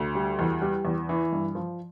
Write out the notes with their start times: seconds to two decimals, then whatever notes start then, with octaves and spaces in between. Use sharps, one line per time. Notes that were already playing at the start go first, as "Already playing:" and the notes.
Already playing: D2
0.15 G3
0.39 E2
0.62 G3
0.85 E2
1.09 E3
1.32 G2
1.55 F3